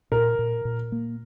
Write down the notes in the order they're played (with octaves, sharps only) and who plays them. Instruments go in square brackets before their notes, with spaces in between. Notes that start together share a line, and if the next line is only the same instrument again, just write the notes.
[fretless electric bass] A#2 [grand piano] A#4
[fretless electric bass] A#2
A#2
A#3